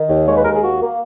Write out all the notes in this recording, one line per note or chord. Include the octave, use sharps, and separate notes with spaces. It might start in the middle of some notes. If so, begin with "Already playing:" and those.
Already playing: D#3
D#2
G#3 C#5
B4
D#2 A#4
G#4
A#3 F#4
A#3